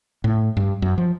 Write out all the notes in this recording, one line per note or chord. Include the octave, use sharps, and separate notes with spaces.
A2
G2
F#2
F3